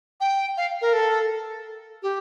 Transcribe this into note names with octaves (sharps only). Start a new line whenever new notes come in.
G5
F5
A#4
A4
G4